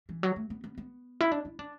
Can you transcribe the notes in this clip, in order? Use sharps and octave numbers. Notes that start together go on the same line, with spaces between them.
E3
F#3
A3
B3
B3
B3
E4
D4
E4
D4